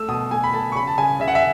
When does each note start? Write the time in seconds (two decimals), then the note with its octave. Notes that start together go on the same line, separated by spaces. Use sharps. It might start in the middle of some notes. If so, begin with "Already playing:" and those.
Already playing: A3 E6
0.08 B2 D#6
0.31 A3 G#5
0.44 B5
0.53 A3 A5
0.72 C#6
0.75 C#3 B5
0.87 A5
0.98 C#3 G#5
1.20 C#3 E5
1.28 F#5
1.35 E5